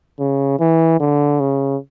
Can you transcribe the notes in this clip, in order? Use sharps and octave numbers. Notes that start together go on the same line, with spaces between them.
C#3
E3
D3
C#3